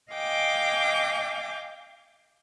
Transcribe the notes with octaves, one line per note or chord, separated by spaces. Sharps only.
D#5 F5 G5 G#5 D6